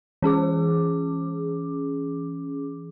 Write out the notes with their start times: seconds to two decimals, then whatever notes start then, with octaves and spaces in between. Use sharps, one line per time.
0.22 E3 C#4 G#4 D6